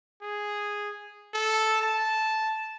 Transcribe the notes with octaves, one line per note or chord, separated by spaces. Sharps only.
G#4
A4
A5